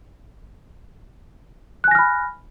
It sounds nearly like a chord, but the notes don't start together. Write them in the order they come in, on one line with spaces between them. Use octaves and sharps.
F#6 G#5 A#6 F6 B5